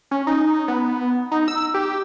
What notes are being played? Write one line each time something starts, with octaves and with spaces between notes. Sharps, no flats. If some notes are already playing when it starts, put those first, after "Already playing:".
C#4
D#4
B3
D#4
E6
G4